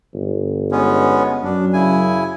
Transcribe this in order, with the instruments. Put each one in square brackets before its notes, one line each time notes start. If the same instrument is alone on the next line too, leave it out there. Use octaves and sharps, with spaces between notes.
[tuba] G1
[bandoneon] G#3 B3 C#4
[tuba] F#2 [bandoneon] D4
[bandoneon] C#3 E4 G#5